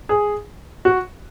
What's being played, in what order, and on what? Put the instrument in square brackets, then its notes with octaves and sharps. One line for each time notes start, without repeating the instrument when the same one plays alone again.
[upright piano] G#4
F#4